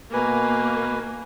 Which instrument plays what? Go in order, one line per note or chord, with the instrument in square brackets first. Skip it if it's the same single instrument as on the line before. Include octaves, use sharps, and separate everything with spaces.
[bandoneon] B2 B4 G#5 [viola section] A#3